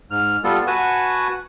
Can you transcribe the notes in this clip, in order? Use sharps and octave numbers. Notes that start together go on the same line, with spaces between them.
G#2 F6
G3 B3 F4 A4
F#4 B4 F#5 G#5 A5 C#6